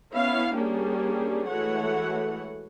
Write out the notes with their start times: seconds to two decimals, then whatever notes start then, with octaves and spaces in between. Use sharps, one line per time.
0.13 B3 C#4 E4 C#5 F5
0.54 G3 A#3 C#4 D4 G4 G#4
1.48 E3 G#3 A3 F#4 C#5 F#5